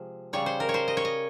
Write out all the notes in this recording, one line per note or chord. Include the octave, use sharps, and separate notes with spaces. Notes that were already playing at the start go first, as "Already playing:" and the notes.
Already playing: C3 F3 G#3
C#3 G3 C#5
C5
A#4
C#5
C5
D#5
C#5
D#5